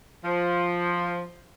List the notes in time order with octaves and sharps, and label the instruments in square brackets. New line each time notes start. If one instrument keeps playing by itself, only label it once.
[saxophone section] F3